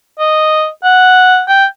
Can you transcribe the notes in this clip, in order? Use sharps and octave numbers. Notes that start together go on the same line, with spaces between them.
D#5
F#5
G5